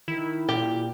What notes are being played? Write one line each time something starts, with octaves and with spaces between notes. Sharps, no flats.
D#3 E4
A#2 G4